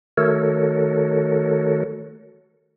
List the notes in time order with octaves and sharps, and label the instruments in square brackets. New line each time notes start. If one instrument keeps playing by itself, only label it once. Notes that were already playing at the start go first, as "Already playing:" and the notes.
[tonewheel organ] D#3 A3 F#4 A4 A#4 C#5